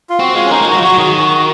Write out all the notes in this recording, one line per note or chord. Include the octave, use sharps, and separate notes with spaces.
F4
C4 F#4
G#3 F4
C#4
A#3 D#4
G#3
F#3 F#4
F4
F#3 F#4
D#3 G#4
F#4